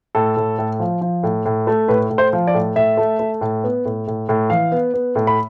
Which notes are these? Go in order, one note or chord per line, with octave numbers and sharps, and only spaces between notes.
A2 A4
A2
A2
F3
F3
A2
A2
A3
A2 B4
A2
C5
F3
D5
A2
A2 E5
A3
A3
A2
B3
A2
A2
A2
E3 F5
B3
B3
A2
B5